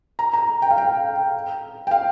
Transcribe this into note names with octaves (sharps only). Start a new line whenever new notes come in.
A#5
A#5
G5
F5
G5
G5
F5